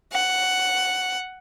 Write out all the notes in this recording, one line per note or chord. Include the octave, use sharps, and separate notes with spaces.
F#5